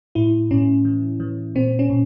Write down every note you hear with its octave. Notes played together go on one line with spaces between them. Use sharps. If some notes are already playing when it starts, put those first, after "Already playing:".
A2 E4
A2 C#4
E3
E3
A#2 C4
C#4
A#2